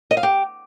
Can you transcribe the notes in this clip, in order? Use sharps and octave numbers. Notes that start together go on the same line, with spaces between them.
D#5
F5
G4